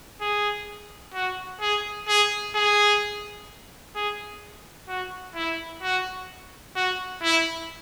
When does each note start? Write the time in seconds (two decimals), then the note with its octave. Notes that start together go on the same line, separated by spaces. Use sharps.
0.21 G#4
1.14 F#4
1.61 G#4
2.08 G#4
2.55 G#4
3.95 G#4
4.89 F#4
5.36 E4
5.83 F#4
6.76 F#4
7.23 E4